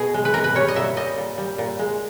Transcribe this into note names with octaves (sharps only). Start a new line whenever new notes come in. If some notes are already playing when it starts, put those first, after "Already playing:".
Already playing: B2 G#4
G#3
B4
B2 A#4
B4
G3 C#5
D#5
A#2 E5
G3 D#5
A#2
G3
A#2
G#3